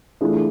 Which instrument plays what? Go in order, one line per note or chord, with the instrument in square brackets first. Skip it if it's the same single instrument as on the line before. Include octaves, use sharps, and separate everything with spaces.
[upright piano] E3 A3 D4 F4 G#4